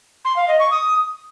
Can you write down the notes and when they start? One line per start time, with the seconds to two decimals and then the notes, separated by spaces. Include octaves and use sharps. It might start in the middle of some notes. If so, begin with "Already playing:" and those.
0.25 C6
0.36 F5
0.48 D#5
0.60 C#6
0.71 D#6